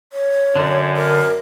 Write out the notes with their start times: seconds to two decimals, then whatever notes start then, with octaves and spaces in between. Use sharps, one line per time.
0.13 C#5
0.56 F#2 D3 D4
0.97 A#4